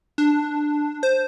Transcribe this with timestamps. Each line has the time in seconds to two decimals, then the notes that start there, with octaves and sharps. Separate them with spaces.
0.18 D4
1.03 C5